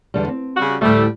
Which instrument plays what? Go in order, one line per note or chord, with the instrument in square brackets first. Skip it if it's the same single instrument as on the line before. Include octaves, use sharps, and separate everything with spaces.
[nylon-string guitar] E2 D3 G3
C4
[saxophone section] C#3 G3 F#4
[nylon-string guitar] D2 A2 [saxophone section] G3 A3